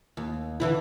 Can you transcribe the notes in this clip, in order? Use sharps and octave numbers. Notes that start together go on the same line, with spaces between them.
D#2
D3 E3 E4